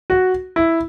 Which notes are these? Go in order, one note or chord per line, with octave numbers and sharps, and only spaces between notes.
F#4
E4